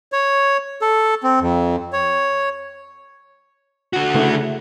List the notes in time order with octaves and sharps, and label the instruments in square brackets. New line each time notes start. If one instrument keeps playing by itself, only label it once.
[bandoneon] C#5
A4
C4
F2
C#5
[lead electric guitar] D3 F#4
[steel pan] C#3 A3 E4